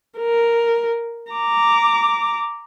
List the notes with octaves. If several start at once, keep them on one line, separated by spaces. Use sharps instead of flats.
A#4
A#5 D6